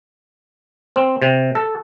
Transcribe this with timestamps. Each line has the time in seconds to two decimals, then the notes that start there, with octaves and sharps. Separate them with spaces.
0.96 C4
1.22 C3
1.55 A4